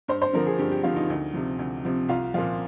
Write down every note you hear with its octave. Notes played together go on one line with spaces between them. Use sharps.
G2 C5
C5
D3 F3 A#4
G#4
G2 G4
G4
D3 F3 F4
D#4
D2
C3 F3
D2
C3 F3
C2 F4
A#2 F3 F4